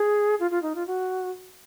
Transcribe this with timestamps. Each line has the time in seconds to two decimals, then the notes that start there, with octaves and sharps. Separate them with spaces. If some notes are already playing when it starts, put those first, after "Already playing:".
Already playing: G#4
0.40 F4
0.51 F4
0.62 D#4
0.75 F4
0.87 F#4